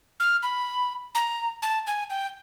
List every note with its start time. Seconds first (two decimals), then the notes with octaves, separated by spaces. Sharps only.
0.20 F6
0.43 B5
1.15 A#5
1.62 A5
1.87 G#5
2.10 G5